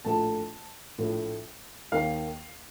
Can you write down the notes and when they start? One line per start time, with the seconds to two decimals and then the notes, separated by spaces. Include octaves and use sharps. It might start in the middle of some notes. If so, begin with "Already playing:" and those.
0.05 A#1 A2 A3 A5
0.98 A#1 A2 A3
1.92 D#2 D#3 A#3 F5